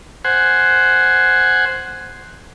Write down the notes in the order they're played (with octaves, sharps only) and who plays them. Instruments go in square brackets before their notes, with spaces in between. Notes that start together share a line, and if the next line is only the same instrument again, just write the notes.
[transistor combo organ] C5 F#5 G#5